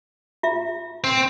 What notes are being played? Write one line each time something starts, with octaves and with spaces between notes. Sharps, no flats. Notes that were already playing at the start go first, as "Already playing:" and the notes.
F4 E5
C4